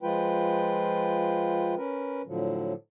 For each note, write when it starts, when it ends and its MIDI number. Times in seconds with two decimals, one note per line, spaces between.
0.03 1.75 53
0.03 1.75 56
0.03 1.75 65
0.03 1.75 71
0.03 1.75 79
1.77 2.22 61
1.77 2.22 70
1.77 2.22 71
2.27 2.73 45
2.27 2.73 50
2.27 2.73 53
2.27 2.73 54